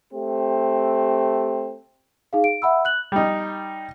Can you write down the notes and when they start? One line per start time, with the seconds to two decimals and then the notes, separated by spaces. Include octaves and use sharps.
0.13 A3 C4 G4
2.33 D#4 G#4 F5
2.44 D7
2.62 E5 F#5 B5 E6
2.85 F#6 F#7
3.12 G3 D#4